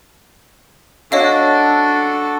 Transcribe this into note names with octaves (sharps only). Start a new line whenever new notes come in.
D4 F#4 A4 C#5 D#5 F5